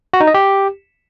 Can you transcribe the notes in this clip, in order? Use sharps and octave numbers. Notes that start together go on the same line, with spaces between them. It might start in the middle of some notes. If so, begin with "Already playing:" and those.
F#4
D#4
D#5
G4